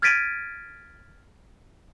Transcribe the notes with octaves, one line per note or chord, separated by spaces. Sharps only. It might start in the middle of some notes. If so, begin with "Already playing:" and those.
F6 G#6 A6 B6 D7 D#7